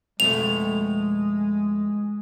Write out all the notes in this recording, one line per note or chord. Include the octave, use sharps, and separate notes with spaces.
F2 B2 G#3 A3 F7